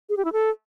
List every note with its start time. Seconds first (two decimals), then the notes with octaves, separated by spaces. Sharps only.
0.09 G#4
0.17 G4
0.25 E4
0.32 A4